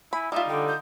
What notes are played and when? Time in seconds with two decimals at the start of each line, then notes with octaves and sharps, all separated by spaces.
0.13 E4 G#5 B5
0.32 G3 D#4 F4 E5
0.48 D3 G5
0.68 G6